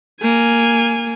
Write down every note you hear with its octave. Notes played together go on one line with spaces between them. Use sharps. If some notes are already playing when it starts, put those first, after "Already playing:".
A#3 G#5